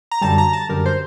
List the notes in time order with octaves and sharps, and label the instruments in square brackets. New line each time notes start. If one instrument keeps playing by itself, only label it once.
[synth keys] A#5
F#2 D3 G3 A5
A#5
A5
F#2 D3 G3 A#4
C5